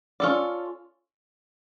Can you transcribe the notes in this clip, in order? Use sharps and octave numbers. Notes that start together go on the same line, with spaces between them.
C#4 F4 A4 D5